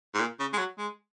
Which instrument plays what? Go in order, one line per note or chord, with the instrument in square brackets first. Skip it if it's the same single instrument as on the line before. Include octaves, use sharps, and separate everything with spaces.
[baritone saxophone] G#2
A#2
C#3
G#3
F#3
G#3